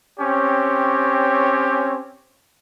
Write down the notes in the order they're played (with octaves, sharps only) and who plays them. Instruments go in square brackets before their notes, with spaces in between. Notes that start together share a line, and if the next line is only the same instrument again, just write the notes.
[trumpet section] C4 C#4 G4 C#5